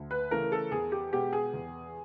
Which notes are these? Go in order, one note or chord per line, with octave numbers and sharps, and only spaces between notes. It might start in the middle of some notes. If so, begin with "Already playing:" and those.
Already playing: D2
B4
C#3 E3 A3 A#4
A4
E2 G#4
G4
B2 G#3 G4
G#4
E2